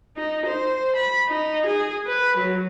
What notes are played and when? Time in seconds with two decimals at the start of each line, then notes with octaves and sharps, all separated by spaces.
0.17 D#4
0.46 C5
0.96 B5
1.28 D#4
1.66 G#4
2.07 B4
2.37 F#3